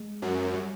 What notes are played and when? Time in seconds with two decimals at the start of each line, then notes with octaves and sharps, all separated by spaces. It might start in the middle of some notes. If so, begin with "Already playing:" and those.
Already playing: G#3
0.22 F#2
0.54 G3